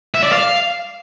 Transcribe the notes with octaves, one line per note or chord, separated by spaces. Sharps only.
E5
D5
F5